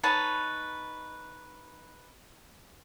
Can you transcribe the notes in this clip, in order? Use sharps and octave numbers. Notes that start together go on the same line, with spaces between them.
D#4 B4 C#5 A5